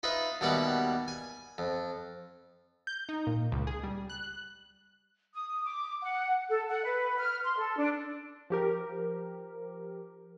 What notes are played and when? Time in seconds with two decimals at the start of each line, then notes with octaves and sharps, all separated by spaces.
0.03 D#4 F4 B4 E5
0.41 D#2 B2 G3 E5 F#5 D6
1.08 G#5
1.58 F2
2.87 G6
3.09 D#4
3.27 A#2
3.52 C#2
3.67 G#4
3.83 G3
4.10 F#6
5.34 D#6
5.64 D6
6.02 F#5
6.49 A4
6.69 F#5
6.84 B4
7.18 F6
7.44 C6
7.59 A4
7.77 D4
8.50 F3 G4 A#4